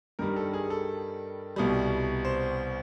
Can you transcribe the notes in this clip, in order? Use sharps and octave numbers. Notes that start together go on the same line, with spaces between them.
G2 D#3 G3 A#4
A4
G#4
A4
C2 B2 G3
C5